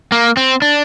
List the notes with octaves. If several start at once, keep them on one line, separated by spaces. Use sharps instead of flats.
A#3
C4
D4